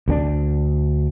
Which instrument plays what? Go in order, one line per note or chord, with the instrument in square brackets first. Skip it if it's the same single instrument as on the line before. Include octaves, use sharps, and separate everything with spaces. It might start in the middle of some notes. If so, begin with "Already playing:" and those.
[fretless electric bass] D2 A#3 D4